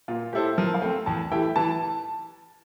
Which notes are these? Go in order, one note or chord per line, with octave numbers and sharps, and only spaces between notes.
A#2 F4
A3 E4 G4 A4 C5
F3 A#4
F5
A3 C4 G5
E2 A5
E3 A3 E4 G4 G5
E3 A5